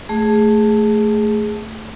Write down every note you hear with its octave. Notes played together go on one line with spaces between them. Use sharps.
A3 G#4